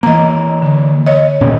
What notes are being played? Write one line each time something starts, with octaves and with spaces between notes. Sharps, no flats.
E3 A#3 D#5 A#5
D3
C#5 D#5
D#1 A#2 C#4